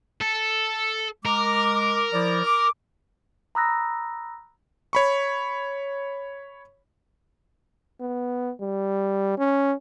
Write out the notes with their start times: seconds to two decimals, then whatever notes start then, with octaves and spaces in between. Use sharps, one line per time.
0.21 A4
1.25 G#3 A#4 D6
2.14 F3 E4 D5
2.45 D6
3.55 A#5 B5 D#6 E6 F#6 A#6
4.93 C#5 B5 C#6
8.01 B3
8.61 G3
9.38 C#4